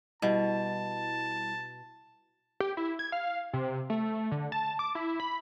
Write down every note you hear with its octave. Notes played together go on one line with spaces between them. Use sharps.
B2 G3 E4 A5
G4
E4
G#6
F5
C3
A3
D3
A5
D6
E4
B5